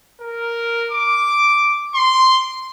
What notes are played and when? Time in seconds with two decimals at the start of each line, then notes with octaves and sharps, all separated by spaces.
0.21 A#4
0.91 D6
1.95 C6